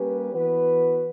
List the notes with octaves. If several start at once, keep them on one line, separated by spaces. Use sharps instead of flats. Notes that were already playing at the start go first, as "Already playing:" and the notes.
Already playing: G3 A#3 C#4 G4 B4
E3 B3 F#4 B4